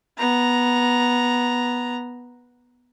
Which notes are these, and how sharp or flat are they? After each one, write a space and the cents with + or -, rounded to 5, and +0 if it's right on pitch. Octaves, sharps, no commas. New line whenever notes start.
B3 -10 A#5 +0